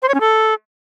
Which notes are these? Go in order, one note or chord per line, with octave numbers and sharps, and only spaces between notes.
C5
C#5
C#4
A4